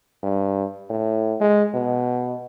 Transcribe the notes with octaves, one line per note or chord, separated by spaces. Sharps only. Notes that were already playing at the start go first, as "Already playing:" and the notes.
G2
A2
G#3
B2